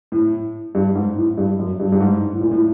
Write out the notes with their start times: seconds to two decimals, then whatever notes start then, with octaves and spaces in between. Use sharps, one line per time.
0.12 A2
0.75 G2
0.95 G#2
1.17 A2
1.38 G2
1.59 F#2
1.80 G2
1.92 G2
2.00 G#2
2.33 A2
2.41 A#2
2.51 A2